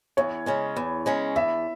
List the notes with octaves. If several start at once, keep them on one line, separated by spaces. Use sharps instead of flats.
E2 C#5
C#3 G#3 C#4
E2
C#3 G#3 C#4
E2 E5